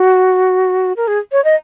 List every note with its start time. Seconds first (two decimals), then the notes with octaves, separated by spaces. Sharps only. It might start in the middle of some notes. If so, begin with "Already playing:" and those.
Already playing: F#4
0.97 A#4
1.08 G#4
1.32 C#5
1.44 D#5